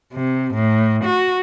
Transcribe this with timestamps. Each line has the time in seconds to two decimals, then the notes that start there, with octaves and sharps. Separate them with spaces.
0.13 C3
0.54 A2
1.05 F#4